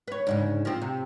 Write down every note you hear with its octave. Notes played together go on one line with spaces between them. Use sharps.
B4 C#5
D2 G#2 C#3
F3 C4
C3